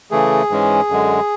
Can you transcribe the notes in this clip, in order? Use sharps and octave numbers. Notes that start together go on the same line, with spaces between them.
C#3 E3 A3 G#4
G#2 E3 G#3 C#4
F#2 D3 G#3